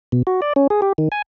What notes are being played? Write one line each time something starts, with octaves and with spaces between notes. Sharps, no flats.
B2
F#4
D5
C#4
G#4
G4
D#3
G#5